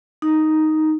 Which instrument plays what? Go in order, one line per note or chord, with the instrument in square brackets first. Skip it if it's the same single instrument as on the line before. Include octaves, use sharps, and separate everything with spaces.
[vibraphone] D#4